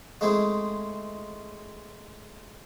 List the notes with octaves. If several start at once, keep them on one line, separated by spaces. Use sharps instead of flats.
G#3 A3 C4 E4 G#4